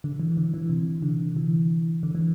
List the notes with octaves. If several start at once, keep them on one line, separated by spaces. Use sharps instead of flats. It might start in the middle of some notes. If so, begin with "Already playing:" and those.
D3
E3
D3
E3
C3
D3
E3
D3
E3